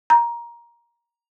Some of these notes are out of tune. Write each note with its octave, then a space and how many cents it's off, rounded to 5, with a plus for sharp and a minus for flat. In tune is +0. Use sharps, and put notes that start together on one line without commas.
A#5 +15